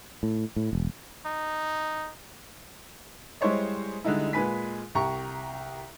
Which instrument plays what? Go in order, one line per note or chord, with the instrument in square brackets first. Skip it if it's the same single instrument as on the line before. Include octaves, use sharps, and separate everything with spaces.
[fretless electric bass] A2
A2
E1
[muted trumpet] D#4
[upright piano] G3 G#3 E4 C5 C#5 D#5
D3 G3 G#3 D#4 E4
A#2 G#3 B4 G#5 B6
C2 G4 A#5 C#6